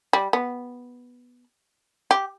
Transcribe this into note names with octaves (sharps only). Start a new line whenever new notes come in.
G3
B3
G4